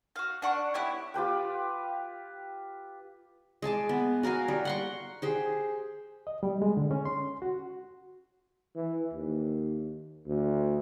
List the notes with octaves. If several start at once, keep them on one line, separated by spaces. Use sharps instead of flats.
F#4 F5
D4 F#5 C#6
B3 E4 G4 C#5
F4 G4 B4 G5
G#3 G#5 A5 D6
B3
F#4 A#4 F5 G#5
G3
F#5 C6 C#6
G4 G#4 C5
D#5
G3
G#3
D3
C#4
C6
F#4
E3
D#2
D2